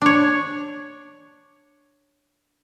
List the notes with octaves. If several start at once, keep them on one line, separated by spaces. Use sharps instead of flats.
D4 C#5